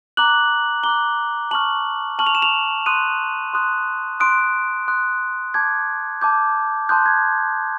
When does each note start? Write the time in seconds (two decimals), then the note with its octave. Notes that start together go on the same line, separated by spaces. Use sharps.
0.17 A#5 D6 F#6 F#7
0.84 A#5 D6 F#6 G7
1.51 A5 C#6 F6 F#7
2.19 A5 C#6 F6 F#7
2.27 F7
2.35 E7
2.42 F7
2.86 C6 D#6 F#6 D#7
3.54 C6 D#6 F#6
4.20 C6 D#6 F#6 D7
4.88 C6 D#6 F#6
5.54 A5 D6 G6 G#6
6.21 A5 D6 G6
6.89 A5 C6 D#6 F#6 G6
7.06 G#6